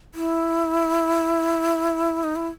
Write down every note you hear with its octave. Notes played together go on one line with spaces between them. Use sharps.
E4
D#4
E4